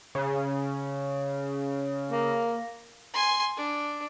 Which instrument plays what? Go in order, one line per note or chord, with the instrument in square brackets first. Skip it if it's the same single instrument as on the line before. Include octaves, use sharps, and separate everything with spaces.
[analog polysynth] C#3
[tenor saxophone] A#3
[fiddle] G#5 C6
D4